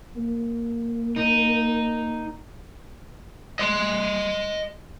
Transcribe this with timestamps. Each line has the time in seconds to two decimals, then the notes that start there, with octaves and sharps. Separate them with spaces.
0.15 A#3
1.16 D#4
3.59 D#5 C6